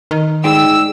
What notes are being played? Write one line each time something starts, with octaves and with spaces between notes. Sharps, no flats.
D#3
G#2 G#4 D5 G5 E6